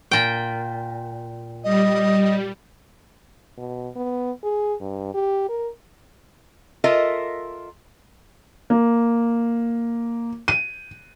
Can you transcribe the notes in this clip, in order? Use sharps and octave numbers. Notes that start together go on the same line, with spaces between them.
A#2 G5
G3 D#5
B2
B3
G#4
G2
G4
A#4
F4 A4 A#4 D#5 E5
A#3
D#7